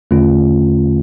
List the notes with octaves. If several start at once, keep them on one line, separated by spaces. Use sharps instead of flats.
E2 D3 A3 C#4 F4